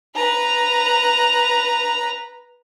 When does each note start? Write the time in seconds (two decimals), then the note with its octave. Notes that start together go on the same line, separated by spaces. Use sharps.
0.16 B4 A#5